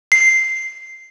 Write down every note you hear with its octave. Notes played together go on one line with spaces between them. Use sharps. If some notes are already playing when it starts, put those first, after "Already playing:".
C7